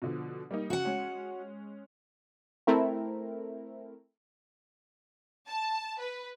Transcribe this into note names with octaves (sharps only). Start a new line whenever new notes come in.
B2 D3 F3
G3 A#3 D#4
C#3 F#4 F#5
G#3 C#4
A3 C4 E4 A#4
A5
B4